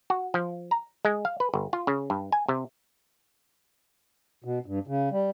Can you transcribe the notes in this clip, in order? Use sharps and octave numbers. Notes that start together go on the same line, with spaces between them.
F#4
F3
A#5
G#3
F5
B4
G1
F4
C#3
G2
G#5
C3
B2
G2
C#3
G3